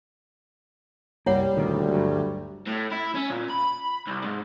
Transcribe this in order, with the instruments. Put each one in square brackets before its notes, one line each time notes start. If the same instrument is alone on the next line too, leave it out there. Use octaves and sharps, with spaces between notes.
[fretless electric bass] C2 F#2 A#3 [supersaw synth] G3 [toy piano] E4 C#5 F#5
[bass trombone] D2 [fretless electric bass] A#2 D#3 A#3
[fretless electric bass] G1 F#3
[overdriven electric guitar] A2
E4
C#4
A#2
B5
C2
G#2